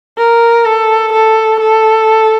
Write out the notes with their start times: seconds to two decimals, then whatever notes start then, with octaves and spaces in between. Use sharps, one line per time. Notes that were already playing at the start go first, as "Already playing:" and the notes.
0.18 A#4
0.66 A4
1.13 A4
1.60 A4